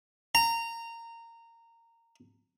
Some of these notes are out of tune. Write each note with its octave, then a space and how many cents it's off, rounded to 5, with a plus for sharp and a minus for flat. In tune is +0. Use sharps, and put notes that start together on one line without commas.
A#5 -15